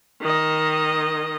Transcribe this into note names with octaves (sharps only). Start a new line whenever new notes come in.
D#3 D#5